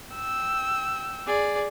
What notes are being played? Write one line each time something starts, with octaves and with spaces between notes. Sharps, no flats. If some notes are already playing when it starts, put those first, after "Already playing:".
G5 E6
G#4 D5